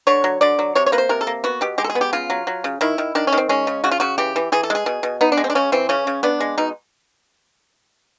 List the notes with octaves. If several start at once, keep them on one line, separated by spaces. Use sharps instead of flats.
D3 C#5
F#3
D3 D5
F#3
C3 C#5
C#5
A#3 B4
C5
C3 A#4
A4
A#3
B3 F#4
B2 G4
G#3 G4
A4
G#4
B3
G4
C#3 F4
F#3
F#3
C#3
D#3 E4
D#3
D#3 D4
C#4
D#3
C4
G#3 C#4
C#3
C#3 F#4
F4
C#3 F#4
E3 G4
E3
E3 G#4
A4
G#3 G#4
B2
B2
B3 D#4
D4
G#3
C4
D4
C#3 C#4
E3 C4
C#3 C#4
C#3
B3 D4
G#3
B2 D#4